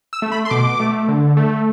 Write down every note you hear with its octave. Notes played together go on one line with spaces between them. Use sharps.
E6
A3
B5
C6
B2 D6
A3
D3
A3